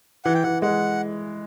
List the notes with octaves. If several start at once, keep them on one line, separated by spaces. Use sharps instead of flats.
E3 F#5
G5
E3 F#5
G#3 F#5